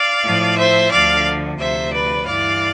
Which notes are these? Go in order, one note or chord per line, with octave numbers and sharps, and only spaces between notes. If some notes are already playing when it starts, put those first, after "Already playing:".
Already playing: D5 F5
A2 F3
C5 E5
D2 D3 F3 D5 F5
D2 C3 F3 C5 E5
B4 D5
G2 E3 D5 F5